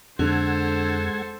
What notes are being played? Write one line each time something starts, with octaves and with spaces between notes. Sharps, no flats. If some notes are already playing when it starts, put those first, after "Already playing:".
F2 D3 G#3 A4 C5 F#5 G#6